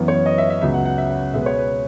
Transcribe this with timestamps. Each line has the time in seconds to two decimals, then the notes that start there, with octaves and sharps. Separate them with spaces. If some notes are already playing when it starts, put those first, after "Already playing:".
Already playing: F#2 E3 B3
0.08 C#5
0.26 D#5
0.38 E5
0.50 E5
0.61 C#2 C#3 F#3 B3 E5
0.74 F#5
0.85 F#5
0.98 E5
1.10 F#5
1.34 B2 G#3 B3 E5
1.41 B4
1.46 C#5
1.58 B4